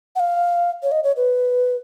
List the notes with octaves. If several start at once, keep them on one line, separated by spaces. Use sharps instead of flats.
F#5
F5
C#5
D#5
C#5
B4